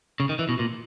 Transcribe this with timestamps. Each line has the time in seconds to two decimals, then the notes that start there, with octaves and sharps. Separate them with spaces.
0.20 C#3
0.29 D#3
0.39 E3
0.49 B2
0.59 A#2